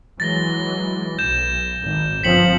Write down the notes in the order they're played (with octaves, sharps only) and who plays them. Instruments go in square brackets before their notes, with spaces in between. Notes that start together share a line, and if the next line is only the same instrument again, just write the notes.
[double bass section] E3 F#3 G#3 [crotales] A6 A#6 G7
[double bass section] B1 [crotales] G6 E7
[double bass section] G#1
[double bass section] G1 F3 C4 [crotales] B6 C#7 F#7